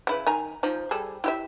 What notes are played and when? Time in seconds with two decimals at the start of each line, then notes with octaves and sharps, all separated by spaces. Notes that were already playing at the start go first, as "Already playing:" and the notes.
0.07 C#3 E4 B4
0.27 D#3 G#5 A#5
0.63 F3 D#4
0.91 G3 G#4 A4
1.24 E4 G4 E5